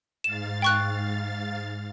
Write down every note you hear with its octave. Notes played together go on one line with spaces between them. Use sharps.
G#2 F5 A6 E7
G5 C#6 F#6